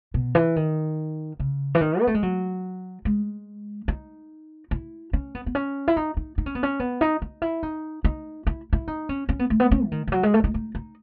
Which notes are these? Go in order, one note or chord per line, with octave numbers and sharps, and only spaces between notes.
B2
E3
D#3
C#3
E3
D#3
B3
A3
G#3
F#3
G#3
D#4
E4
C#4
B3
B3
C#4
E4
D#4
D#4
D#4
C#4
B3
C#4
B3
D#4
D#4
E4
D#4
D#4
E4
E4
D#4
C#4
C#4
B3
A3
B3
C#4
E3
D#3
E3
F#3
G#3
A3
D#4
D#4
D#4